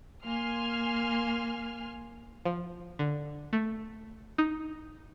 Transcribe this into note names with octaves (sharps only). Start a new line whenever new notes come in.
A#3 G#5 C6 F6
F3
D3
A3
D#4